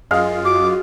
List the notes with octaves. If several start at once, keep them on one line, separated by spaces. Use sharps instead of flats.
F#2 G#3 F4 F5
F#4 D6